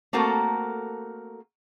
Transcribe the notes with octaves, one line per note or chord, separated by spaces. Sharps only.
A3 A#3 C4 F#4 A4 A#4